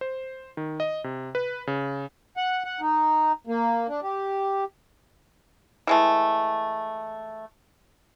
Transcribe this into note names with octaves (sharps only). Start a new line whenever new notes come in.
C5
D#3
D#5
C3
B4
C#3
F#5
F#5
D#4
A#3
D4
G4
E3 G#3 A3